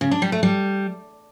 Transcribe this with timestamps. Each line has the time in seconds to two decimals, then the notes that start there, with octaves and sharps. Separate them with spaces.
0.01 C#3
0.11 D4
0.22 G3
0.32 A3
0.43 G3